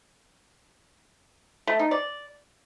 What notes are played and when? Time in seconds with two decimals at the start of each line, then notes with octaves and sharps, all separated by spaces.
1.67 A3
1.79 D#4
1.91 D5